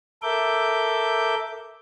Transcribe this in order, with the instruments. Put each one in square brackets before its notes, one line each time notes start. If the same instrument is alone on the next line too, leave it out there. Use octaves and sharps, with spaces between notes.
[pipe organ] A4 A#4 E5 D6 G6